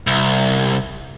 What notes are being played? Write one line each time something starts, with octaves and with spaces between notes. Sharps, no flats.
C2